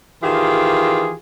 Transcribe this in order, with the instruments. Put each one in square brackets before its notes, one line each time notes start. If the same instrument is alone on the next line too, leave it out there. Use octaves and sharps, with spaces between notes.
[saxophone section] D#3 E3 F4 G4 G#4